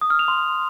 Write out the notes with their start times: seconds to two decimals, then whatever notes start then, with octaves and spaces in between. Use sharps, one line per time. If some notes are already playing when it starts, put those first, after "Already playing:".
0.01 D#6
0.10 F6
0.19 F7
0.28 C6